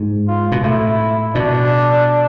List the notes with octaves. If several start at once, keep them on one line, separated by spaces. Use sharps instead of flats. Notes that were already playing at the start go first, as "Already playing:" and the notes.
Already playing: G#2
F4
B2
A2 E4
B2 D4